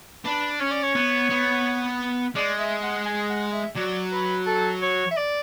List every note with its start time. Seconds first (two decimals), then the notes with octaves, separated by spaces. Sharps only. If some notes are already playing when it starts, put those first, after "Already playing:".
0.25 D4 B4
0.60 C#4 C#5
0.71 D5
0.83 C#5
0.95 B3
1.30 B3
2.35 G#3 D5
2.59 E5
2.82 F#5
3.05 G#5
3.29 F#5
3.52 E5
3.76 F#3 D5
4.12 B4
4.46 A4
4.82 C#5
5.11 E5
5.17 D5